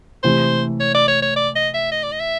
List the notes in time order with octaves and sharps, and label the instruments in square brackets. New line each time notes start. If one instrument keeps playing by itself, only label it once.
[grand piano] C3 E3 A3 [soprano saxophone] C5
[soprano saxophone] C#5
D5
C#5
C#5
D5
D#5
E5
D#5
D5
D#5
E5